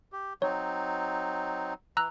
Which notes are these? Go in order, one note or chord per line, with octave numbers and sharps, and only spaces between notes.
G4
F#3 C4 D#4 C#5
E3 A#5 E6 F#6